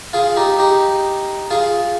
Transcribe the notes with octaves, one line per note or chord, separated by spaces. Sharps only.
F4 G#4
D#4 G4
D#4 G4
F4 G#4